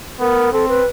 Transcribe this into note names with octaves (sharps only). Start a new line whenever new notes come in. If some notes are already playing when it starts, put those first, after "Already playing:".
B3 A#4
C4 A4
B4